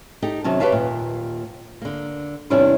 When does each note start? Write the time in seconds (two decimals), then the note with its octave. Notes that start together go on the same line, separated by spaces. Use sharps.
0.22 D#4 G4 A4
0.44 C3 D#3 F#3 C#4 A5
0.60 G4 B4 C#5 E5 F5 A5
0.72 D#2 A#2
1.82 D3 A#3
2.50 E2 C3 G3 C#4 D4 E4